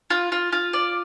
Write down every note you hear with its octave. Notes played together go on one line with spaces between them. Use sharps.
F4
F4
F4
D5